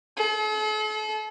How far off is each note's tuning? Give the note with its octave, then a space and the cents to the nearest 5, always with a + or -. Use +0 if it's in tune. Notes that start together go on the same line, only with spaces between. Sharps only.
A4 -45